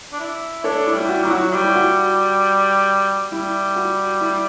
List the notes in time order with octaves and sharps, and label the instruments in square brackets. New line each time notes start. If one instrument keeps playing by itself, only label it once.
[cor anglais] D4
E4
[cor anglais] D4 [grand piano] A4 C#5
[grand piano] E4
[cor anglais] G3
[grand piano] E4
F#4
[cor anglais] F#3 [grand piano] E4
[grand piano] F#4
[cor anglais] G3 [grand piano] F#4
[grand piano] E4
F#4
[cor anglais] G3 [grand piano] E4
[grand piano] F#4
E4